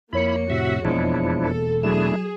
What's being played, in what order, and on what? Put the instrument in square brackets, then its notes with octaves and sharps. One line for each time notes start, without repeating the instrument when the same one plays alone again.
[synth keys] F2 C#5 C#7 [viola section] A#3 [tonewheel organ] E4 B5
[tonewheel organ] A2 C3 E5 [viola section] F#4
[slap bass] E1 B2 A#3 [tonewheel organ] F3 D4 E4 [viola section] G#3
[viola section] A4
[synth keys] F#3 E7 [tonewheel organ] A3 D4 E4 [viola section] G#4